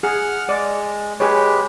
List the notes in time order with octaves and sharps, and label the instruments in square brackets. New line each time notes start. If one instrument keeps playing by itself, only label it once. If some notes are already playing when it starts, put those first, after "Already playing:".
[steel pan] G#4 [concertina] F#5 F6
[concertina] G#3 [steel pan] D5
[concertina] G#3 G4 B4 [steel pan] G#4 C#5